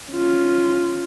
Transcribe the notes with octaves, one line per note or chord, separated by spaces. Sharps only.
C#4 F4